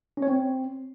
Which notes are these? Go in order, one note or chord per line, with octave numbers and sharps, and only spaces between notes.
C#4
C#5
C4